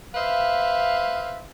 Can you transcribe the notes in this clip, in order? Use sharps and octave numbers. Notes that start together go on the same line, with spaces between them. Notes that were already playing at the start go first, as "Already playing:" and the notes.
B4 C5 E5 F5